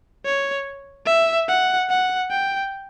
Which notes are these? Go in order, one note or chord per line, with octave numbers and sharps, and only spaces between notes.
C#5
E5
F#5
F#5
G5